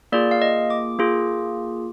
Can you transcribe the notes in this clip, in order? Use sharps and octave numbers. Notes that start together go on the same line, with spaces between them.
A#3 F4 G#4 D5
F5
D#5
D6
A#3 F4 G#4